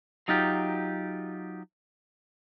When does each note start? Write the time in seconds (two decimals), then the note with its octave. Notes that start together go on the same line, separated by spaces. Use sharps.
0.28 F#3 D#4 F4 G4